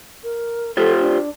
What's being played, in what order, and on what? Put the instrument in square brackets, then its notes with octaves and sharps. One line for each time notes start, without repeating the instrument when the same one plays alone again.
[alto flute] A#4
[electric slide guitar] F4 G4 C5 [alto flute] A4
[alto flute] D4